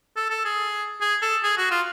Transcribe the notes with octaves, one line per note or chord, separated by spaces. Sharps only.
A4
A4
G#4
G#4
A4
G#4
F#4
F4